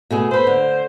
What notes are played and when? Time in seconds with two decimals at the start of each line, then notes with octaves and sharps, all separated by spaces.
0.11 B2 A3 G#4
0.31 A4 B4 C5
0.47 D3